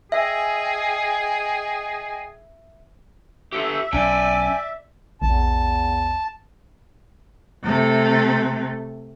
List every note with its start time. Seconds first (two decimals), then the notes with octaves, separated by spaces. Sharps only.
0.12 G#4 D#5 E5 G5 G#5
3.52 G4 A4 E5
3.93 B1 C#4 D5 G5 G#5
5.22 A#1 E2 A5
7.63 C3 A3